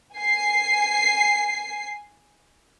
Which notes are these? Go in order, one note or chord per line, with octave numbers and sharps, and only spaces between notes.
G#5 C7